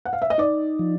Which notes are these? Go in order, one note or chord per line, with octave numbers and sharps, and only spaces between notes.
F#5
F5
E5
D#5
D#4 D5
F3